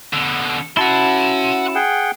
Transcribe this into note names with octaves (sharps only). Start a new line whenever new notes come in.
B2 D3
C#4 E4 F#4 F#5 A5 C6
G#4 F#5 G5